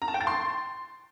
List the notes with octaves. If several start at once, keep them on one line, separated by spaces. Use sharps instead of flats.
A#5
A5
G5
A6
C6